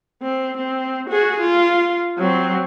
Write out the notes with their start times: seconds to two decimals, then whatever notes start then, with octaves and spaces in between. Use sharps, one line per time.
0.22 C4
0.57 C4
1.09 F#4 G#4
1.40 F4
2.18 F#3 C4